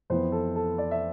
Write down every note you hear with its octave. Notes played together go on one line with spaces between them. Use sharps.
F2 E3 B3 C5
A4
A4
D5
E5